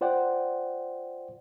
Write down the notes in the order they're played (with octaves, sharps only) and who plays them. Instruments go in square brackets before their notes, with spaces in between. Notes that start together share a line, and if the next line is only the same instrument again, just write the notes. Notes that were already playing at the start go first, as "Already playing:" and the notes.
[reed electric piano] F4 C5 D5 F#5 G5